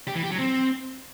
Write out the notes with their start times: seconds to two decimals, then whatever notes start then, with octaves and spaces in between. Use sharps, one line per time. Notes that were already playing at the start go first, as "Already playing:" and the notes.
0.08 G4
0.15 E3
0.23 G4
0.31 F#3
0.39 C4